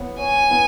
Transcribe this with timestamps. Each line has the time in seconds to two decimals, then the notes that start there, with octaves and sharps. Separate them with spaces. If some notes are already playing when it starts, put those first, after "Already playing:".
Already playing: B3 C#5
0.19 C#5 G#5
0.51 B3